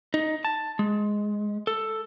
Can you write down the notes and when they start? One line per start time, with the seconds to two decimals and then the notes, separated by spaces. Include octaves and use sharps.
0.14 D#4
0.45 A5
0.79 G#3
1.67 A4